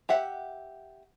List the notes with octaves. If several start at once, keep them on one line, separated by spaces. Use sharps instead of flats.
G4 E5 F#5